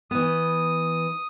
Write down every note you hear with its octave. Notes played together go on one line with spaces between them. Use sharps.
E3 B3 D#6